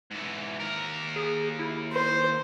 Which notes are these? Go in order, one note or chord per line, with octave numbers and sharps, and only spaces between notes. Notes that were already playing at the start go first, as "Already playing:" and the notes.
G#2 E3
D#2 A#4
G#4
E4
C5